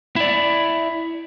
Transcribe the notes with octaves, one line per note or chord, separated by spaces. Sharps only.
E4 D5